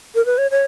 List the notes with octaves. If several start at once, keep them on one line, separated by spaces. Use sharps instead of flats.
A#4
B4
C#5
C#5